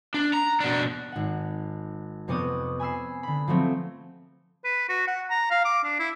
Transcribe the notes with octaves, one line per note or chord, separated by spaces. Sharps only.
D4
A#5
B2 D4
G#1 F#5
F2 C3 B3 G4 C#5 D#6
G#5 B5 E6 C7
D3 B5
F3 F#3 A3 C4
B4
F#4
F#5
A#5
F5
D6
D4
E4